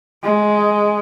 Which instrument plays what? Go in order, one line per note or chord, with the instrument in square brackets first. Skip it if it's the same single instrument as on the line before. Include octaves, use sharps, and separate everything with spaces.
[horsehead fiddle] G#3